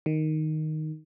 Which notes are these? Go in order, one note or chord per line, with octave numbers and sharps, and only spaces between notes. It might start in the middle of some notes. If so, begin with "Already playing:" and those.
D#3